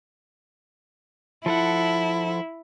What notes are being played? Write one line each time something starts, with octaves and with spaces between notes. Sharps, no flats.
F3 E4 A4 F#5